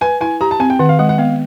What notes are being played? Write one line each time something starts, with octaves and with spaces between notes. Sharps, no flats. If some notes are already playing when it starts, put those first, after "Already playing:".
B4 G#5
E4 G#5
G4 A#5
A5
C4 G#5
G5
D#3 F#5
F5
G#3 F#5
F#5
B3 F5